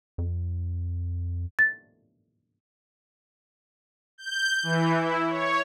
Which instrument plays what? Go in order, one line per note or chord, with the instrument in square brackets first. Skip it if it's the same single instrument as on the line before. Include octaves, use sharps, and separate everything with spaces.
[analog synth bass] F2
[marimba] A6
[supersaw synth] G6
E3
E4
C#5